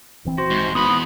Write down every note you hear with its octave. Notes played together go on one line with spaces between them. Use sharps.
D#1 E3 C4
F#4 C5
G#2
E2 B3 B5 D#6